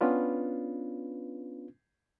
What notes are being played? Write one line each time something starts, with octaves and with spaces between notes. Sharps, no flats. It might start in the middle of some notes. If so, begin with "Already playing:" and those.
B3 C#4 D4 F4 B4